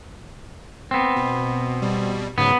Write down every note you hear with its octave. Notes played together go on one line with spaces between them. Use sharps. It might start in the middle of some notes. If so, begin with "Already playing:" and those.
B3 C4
B2
B2 G3
G#2 C#3 F#3 B3